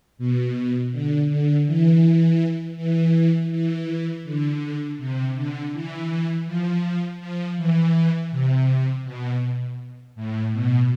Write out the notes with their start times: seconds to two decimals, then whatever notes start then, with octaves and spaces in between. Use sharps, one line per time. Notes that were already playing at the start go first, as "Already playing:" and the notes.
0.18 B2
0.92 D3
1.29 D3
1.66 E3
2.77 E3
3.51 E3
4.24 D3
4.98 C3
5.36 D3
5.73 E3
6.46 F3
7.20 F3
7.57 E3
8.31 C3
9.05 B2
10.16 A2
10.52 B2